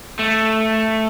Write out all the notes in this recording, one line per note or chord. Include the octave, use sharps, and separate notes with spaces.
A3